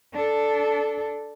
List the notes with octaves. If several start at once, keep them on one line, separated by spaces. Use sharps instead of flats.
D4 A4